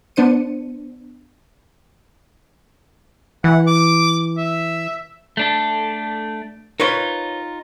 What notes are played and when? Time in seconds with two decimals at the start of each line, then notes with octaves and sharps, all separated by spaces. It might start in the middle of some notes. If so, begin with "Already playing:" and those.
0.16 B3 D4 C5 C#7 D#7
3.44 E3 F#5
3.67 D6
4.38 E5
5.37 A3 D4 A4
6.80 D#4 F4 A#4 B4 C#5